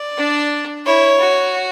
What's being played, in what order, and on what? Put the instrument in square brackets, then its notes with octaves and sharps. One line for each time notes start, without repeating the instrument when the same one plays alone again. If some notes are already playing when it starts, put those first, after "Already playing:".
Already playing: [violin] D5
[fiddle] D4
[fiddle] E4 [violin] C#5
[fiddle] F#4